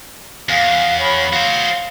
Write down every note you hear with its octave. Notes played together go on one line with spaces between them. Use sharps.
E2 F5
C#5 B5
F#4 C5 F5